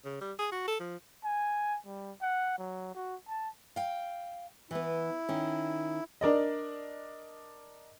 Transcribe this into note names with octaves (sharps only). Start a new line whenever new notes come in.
C#3
G3
G#4
F#4
A4
F3
G#5
G3
F#5
F#3
F#4
A5
F5 G5
E3 B3 E4
D#3 C#4
D4 A#4 D5 D#5